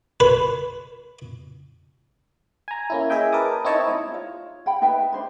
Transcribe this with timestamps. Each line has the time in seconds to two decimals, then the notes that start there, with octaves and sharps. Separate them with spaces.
0.20 B4
2.68 G#5 A#5
2.90 A#3 C#4 E4
3.09 G#4 D#5 E5 G5 G#5
3.32 A#4 B4 A5 D6 D#6
3.65 C4 D#4 E4 C#5 D#5 A5
3.88 D#4 E4
4.12 F4 C#5
4.66 F#5 G5 B5
4.82 D#4 B4 E5 G5
5.12 D4 C5 B5